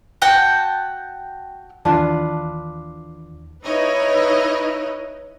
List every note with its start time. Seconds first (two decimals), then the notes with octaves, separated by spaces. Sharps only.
0.22 F#4 F#5 G5 A5
1.85 D#2 E3 D4 F4 B4
3.65 D#4 E4 B4 C#5 D#5